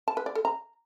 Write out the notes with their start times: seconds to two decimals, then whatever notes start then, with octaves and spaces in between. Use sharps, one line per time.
0.08 A5
0.17 B4
0.26 D5
0.35 A4
0.45 A#5